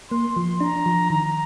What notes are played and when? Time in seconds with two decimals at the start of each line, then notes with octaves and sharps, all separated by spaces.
0.11 A#3 C6
0.36 F3
0.60 D4 A#5
0.86 F3
1.10 D#3 A#5